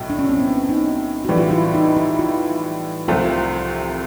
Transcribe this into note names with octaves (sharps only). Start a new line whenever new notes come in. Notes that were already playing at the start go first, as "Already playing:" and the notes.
Already playing: B1 A2 F#3
D4
C#4
C4
B3
D#4
A2 E3 G3 F#4
F4
E4
D#4
E4
F4
C2 C3 F3 A3 F4